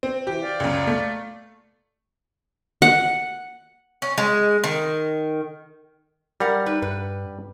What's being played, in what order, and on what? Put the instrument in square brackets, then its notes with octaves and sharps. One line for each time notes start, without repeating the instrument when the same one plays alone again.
[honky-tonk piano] C4
[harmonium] E3 [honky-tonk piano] G4
[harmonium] D5 F5
[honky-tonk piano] C#2 F#2
A3
[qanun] F#5
[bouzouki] C#4
G#3
D#3
[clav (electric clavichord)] G3 [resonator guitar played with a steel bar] A#4 F#5
[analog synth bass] D#4 [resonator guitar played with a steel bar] B4
[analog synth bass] G2 [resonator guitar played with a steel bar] B4